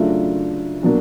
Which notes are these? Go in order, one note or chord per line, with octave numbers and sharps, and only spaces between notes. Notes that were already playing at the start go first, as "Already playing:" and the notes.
Already playing: C#3 F#3 A3 D4 F4
B2 F#3 A#3 D4